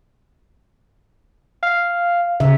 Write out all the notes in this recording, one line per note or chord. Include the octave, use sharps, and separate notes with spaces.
F5
C#3 E5